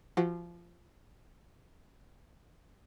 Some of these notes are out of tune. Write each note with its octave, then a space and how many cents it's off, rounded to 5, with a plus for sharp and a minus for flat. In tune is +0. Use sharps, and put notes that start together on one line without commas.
F3 -20 F#4 +0